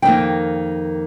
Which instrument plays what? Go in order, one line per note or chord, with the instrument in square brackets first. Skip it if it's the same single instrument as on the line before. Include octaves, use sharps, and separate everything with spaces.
[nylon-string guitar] F2 D#3 A#3 G5